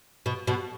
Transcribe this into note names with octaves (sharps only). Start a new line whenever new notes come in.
B2
B2